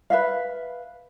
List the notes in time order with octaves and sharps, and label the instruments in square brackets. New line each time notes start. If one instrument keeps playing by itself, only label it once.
[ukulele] B4 E5 F5